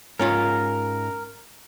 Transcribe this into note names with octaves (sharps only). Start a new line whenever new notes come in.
G#2 C#4 F4 A#4